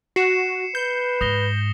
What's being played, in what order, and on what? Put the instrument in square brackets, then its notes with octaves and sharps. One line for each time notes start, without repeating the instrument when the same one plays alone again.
[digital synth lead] F#4 [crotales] C7 C#7 E7
[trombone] B4 [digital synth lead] G6
[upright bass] G#2 [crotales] D#6 A#6 G7